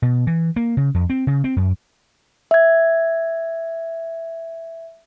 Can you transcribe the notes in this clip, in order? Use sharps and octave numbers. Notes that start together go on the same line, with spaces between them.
B2
E3
A#3
C#3
F2
C4
C#3
C4
F#2
E5 G#6